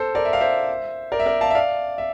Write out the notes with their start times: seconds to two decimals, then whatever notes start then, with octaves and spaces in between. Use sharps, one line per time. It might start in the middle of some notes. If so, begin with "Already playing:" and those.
Already playing: A4 C5
0.15 A#4 D5
0.25 E5
0.33 F5
0.40 C5 E5
1.12 A#4 D5
1.20 E5
1.26 A#4 D5
1.41 F5 A5
1.51 E5
1.55 D5 F5
1.98 E5